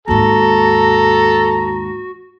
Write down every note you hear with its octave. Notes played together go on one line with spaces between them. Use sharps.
D#2 G#2 F#4 A4 A#5